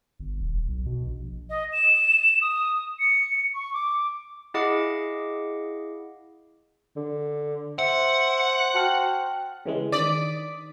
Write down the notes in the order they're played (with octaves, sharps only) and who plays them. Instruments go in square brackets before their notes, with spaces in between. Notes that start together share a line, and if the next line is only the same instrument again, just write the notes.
[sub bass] G1
D#1
B1
B2
A#1
[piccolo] D#5
E7
D#6
C#7
C#6
D6
[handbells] E4 G#4 D#5 F5 F#5 D6
[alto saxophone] D3
[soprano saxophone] C5 [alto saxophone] E5 [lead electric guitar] F#5
[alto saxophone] F#4 [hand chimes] G5 A5 F6
[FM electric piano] C#3 E3 G#3
[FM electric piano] D#3 D#6 B6 [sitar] D5